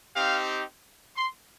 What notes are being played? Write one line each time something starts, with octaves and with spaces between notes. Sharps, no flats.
C4 D#4 G4 F5
C6